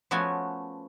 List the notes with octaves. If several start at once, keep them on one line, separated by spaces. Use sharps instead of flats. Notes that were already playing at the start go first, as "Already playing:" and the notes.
F3 A3 B3 C#4 F#4 G#5